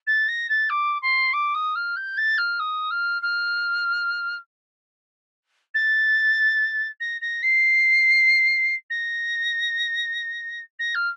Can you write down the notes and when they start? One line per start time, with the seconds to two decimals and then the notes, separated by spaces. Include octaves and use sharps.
0.07 A6
0.28 A#6
0.49 A6
0.69 D6
1.02 C6
1.33 D6
1.54 D#6
1.75 F6
1.96 G6
2.17 A6
2.38 F6
2.59 D#6
2.91 F6
3.22 F6
5.74 A6
7.00 A#6
7.21 A#6
7.43 C7
8.90 A#6
10.79 A#6
10.95 F6